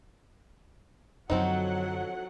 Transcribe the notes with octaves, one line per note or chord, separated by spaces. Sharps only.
F#2 D3 F3 F#3 C4 D#4 A4 F#5